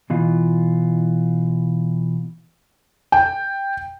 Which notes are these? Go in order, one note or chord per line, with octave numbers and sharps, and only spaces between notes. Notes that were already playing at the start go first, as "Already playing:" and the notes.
B2 E3 F4
G5